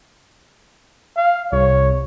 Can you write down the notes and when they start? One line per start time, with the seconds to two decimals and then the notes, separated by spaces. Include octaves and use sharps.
1.17 F5
1.52 C2 C#5